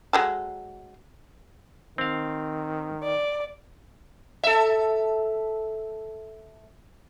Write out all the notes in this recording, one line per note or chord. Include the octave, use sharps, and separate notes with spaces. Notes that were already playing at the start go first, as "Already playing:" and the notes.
F#3 G#3 A4
D#3 C4 F5
D5
A4 E5